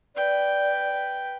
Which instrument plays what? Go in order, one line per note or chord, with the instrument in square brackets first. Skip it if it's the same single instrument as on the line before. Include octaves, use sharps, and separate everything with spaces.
[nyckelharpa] B4 G5 [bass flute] D5